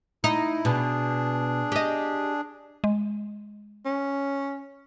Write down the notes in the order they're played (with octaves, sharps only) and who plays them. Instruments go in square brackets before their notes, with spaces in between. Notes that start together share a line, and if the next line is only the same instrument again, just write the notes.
[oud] D#4 [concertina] E4
[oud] B2 [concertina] D4 G#4
[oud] G4 D#5
[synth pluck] G#3
[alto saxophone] C#4